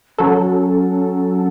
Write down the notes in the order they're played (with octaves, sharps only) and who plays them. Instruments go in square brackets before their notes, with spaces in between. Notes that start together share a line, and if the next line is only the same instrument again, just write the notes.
[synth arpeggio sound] F#3 A4 [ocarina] C#4